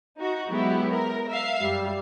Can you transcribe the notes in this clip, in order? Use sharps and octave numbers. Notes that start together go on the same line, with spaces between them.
D#4 F#4
F#3 G#3 B3 E4 G4
A#4
E5 F5 C7
F#2 G3